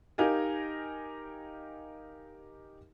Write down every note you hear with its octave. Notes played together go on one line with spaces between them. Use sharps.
D#4 G4 A#4 D#5 F5 G#5